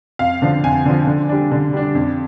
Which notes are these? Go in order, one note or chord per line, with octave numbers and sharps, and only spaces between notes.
F2 F5
D3 F3
F2 G#5
D3 F3
D3
G3 D4
D3
G3 D4
F2